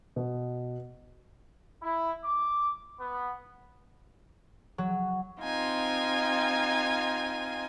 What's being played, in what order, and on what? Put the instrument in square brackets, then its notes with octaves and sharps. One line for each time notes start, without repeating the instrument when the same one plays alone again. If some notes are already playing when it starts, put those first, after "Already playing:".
[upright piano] B2
[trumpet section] E4
D6
B3
[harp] F#3
[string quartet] C4 D#4 F4 G#5